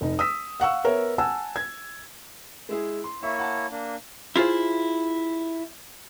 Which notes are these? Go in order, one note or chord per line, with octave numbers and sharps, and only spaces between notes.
F1 D#4
D#6 E6 B6
F5 F#5 C#6 E6
B3 A#4 C#5 E5
F#5 G#5 A5 E6
G#6
G#3 E4 G#4
C6
A#3 E4 C#5 E5 C#6
F#5 A5
A#3 D4
E4 F4 G#4 C5